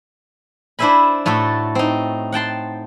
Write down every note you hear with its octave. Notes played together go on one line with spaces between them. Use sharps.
D4 E4 C5 E5 G#5 B5
A2 A3 F#4 A4
C4 D#4
F#5 G5 A5 C6